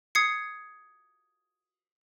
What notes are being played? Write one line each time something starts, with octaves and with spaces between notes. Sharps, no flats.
D#6 G#6 C7 C#7